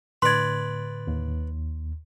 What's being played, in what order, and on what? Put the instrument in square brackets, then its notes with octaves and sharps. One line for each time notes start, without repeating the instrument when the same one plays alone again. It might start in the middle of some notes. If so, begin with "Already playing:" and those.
[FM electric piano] A2 D3 [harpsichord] B4 D5 [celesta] C6 G#6
[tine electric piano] D#2